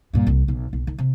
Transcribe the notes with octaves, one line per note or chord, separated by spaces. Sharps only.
G2 A#2
C2
B1
B1
D#3
C3